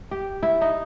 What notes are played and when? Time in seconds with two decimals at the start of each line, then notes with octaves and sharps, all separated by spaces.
0.11 G4
0.43 E4
0.61 D#4